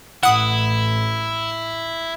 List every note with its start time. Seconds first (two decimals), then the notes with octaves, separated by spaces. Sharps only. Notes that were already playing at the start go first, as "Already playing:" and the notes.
0.23 A1 E4 F#5 D#6